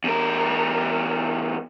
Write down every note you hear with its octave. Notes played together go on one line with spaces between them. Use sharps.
E2 A#4